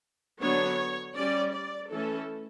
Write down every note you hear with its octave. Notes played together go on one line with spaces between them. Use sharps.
D3 F#3 B3 D4 C#5
G3 C#4 D5
D5
E3 A3 C#4 A4